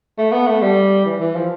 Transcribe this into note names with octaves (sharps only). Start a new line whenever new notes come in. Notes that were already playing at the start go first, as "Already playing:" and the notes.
A3
B3
A3
G3
E3
E3
F3